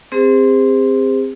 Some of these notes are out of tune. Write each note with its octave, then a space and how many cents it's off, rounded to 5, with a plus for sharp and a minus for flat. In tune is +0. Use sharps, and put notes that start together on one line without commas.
C4 +0 G#4 -45 C5 -25